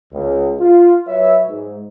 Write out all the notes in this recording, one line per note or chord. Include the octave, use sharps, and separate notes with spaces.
C#2
F4
F#3 B4 C#5 E5
G#2